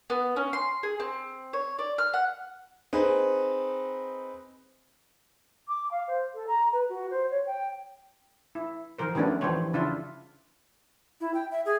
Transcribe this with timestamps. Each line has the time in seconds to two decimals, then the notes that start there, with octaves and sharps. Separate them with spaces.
0.10 B3
0.36 C#4
0.53 C6
0.83 G#4
1.00 C4
1.53 C#5
1.79 D5
1.98 F6
2.14 F#5
2.93 C4 D#4 G#4 B4
5.68 D6
5.91 F5
6.08 C5
6.34 A4
6.47 A#5
6.73 B4
6.89 F#4
7.10 C5
7.31 C#5
7.46 G5
8.55 E4
8.98 D#3 F3 A#4 C5
9.15 D#3 F#3 A3 B3 C#4 D4
9.41 E3 F3 G3 C4 C5 C#5
9.73 C#3 D4 E4 F4
11.20 E4
11.34 G5
11.51 E5
11.65 G#4